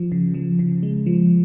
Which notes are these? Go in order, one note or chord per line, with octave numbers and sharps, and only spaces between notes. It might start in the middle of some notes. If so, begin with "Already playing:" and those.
Already playing: F3
C#3
F3
C#3
G#3
F3